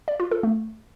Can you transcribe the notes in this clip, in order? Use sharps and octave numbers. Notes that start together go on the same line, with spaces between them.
D5
F4
A4
A3